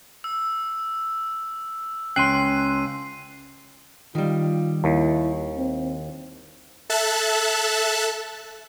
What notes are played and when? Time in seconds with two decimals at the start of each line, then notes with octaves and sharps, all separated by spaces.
0.24 E6
2.16 C#2 C#4 G5 C6 F#6 C7 D#7
4.15 D#3 G3 F4
4.84 D#2 E4
5.57 C4
6.90 A4 E5 A5 F#6